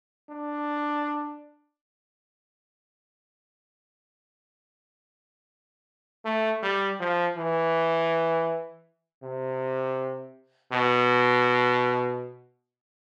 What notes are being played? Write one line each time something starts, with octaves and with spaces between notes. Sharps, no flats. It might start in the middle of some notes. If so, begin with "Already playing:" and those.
D4
A3
G3
F3
E3
C3
B2